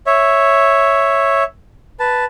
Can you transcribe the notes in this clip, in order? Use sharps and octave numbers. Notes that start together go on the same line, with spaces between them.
C#5 E5
B4 A5